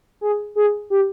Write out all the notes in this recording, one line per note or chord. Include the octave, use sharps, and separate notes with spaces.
G#4
G#4
G4